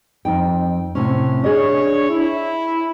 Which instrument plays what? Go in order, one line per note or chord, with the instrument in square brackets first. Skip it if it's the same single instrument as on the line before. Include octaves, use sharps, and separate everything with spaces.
[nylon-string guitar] F2 D#4 G5
A2 C3 C#4
[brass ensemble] D4 C#5 [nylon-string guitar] G#4 D#5
[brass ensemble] E4